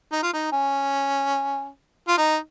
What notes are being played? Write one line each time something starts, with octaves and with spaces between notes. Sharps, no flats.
D#4
F4
D#4
C#4
F4
D#4